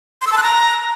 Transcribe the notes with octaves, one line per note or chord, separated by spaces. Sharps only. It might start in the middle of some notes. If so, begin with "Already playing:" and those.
C6
E6
A5
F#6
A#5